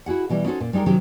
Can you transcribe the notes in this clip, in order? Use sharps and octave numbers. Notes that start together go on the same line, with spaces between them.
E4 F#4 G#4 F#5
B2 E3 G3 G4
C#4 D#4 F#4 A4 C5
A#2
G3 G#3 D#4 G4 A#4
C3 D#3 F#3 C#4 G4